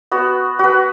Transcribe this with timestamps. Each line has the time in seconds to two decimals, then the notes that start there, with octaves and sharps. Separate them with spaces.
0.11 B3 F#4
0.59 F#4 B4